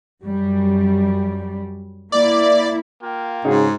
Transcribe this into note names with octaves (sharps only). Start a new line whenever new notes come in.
F#2 G3
A#3 E4 D5
A#3 F4 G5
G#2 C#3 D#4 F#4 G#4